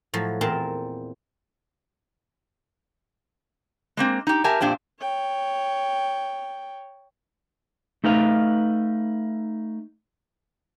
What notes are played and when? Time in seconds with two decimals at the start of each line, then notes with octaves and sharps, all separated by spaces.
0.14 A2 F3 F#3
0.41 E2 A#2 C4 A#4 C5 A5
3.97 G#3 A#3 C4
4.27 D#4 G4
4.44 G4 A#4 E5 G#5 A5
4.61 F2 A#2 D4 G4 C5
5.00 C#5 G5
8.04 A3 D#4 B4 F5